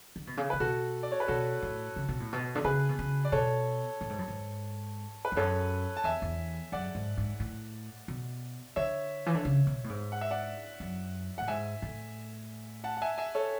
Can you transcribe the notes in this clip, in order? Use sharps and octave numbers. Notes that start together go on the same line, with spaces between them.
D3
B2
C#3
C#3 B4
B2 F#4 A4
D5
C#5
B4
B2 F#4 A4
A2
C#3
B2
A2
B2
D3
C#3 G#4 B4
B2
C#3
D5
B2 A4 C#5
A2
G#2
F#2
G#2
B4
E2
F#2 A4 C#5
A5
E2 E5 G#5
E2
F#2 D5 F#5
G#2
G#2
A2
B2
D3 C#5 E5
E3
D3
C#3
B2
A2
G#2
F#5
E5
D5 F#5
F#2
A2 F#5
G#2 E5 G#5
A2
F#5 A5
F#5
E5 G#5
E5 G#5
A4 C#5